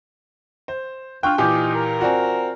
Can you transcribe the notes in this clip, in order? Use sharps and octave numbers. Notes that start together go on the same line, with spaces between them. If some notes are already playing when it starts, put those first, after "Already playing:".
C5
D4 F4 G5 C#6 F6 F#6
A#2 E3 D#4 G4 G#5 D6 G6
A#4
C4 F4 F#4 D5 G#5